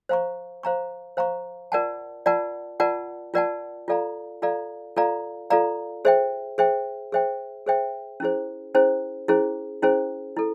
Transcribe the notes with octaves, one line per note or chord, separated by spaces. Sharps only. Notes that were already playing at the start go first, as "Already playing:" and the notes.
C5 F5 A#5 C#6
C5 F5 A#5 C#6
C5 F5 A#5 C#6
F4 A#4 D5 F#5 A5
F4 A#4 D5 F#5 A5
F4 A#4 D5 F#5 A5
F4 A#4 D5 F#5 A5
F4 A4 D5 F5 A#5
F4 A4 D5 F5 A#5
F4 A4 D5 F5 A#5
F4 A4 D5 F5 A#5
G#4 C5 E5 G5
G#4 C5 E5 G5
G#4 C5 E5 G5
G#4 C5 E5 G5
C#4 E4 G#4 C5
C#4 E4 G#4 C5
C#4 E4 G#4 C5
C#4 E4 G#4 C5
E4 A4